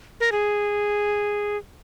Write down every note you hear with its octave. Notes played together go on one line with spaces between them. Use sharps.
A#4
G#4